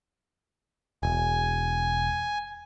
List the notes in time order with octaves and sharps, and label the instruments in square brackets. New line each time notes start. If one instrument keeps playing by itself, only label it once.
[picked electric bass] E1 [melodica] G#5